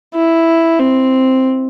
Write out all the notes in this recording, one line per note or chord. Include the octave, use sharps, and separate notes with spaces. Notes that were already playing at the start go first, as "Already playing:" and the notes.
E4
C4